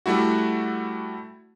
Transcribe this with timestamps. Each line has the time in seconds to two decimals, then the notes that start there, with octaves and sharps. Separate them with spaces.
0.06 G3 A3 E4 F#4